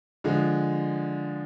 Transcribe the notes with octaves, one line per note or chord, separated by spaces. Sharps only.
D3 F3 G#3